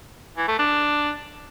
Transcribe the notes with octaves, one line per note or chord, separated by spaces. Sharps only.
E3
A3
D4